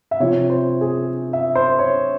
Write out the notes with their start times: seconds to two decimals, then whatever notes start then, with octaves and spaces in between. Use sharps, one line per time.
0.11 E5
0.20 C3 F3 C#5
0.50 C5
0.81 G#4
1.33 E5
1.55 C5
1.79 C#5